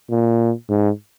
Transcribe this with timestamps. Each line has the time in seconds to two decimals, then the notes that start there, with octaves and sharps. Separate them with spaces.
0.11 A#2
0.69 G#2